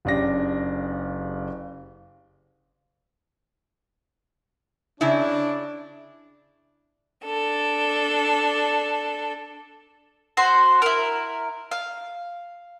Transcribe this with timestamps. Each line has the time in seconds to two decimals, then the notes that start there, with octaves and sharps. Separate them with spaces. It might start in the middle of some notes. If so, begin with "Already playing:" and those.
0.05 F#1 C#3 D4 G4 A#6
5.01 C#3 D4 E4
7.25 D4 A4
10.37 F#4 C5 C6
10.82 E4 A#4
11.71 F5